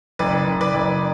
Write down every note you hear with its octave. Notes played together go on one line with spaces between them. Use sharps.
F#1 B4 D5
F#1
B4 D5
F#1